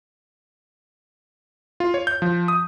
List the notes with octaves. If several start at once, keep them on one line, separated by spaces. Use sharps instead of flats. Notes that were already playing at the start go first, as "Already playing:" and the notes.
F4
C#5
G6
F3
D#6